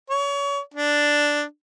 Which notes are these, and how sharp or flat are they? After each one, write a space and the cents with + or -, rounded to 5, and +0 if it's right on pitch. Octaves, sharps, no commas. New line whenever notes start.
C#5 +30
D4 +0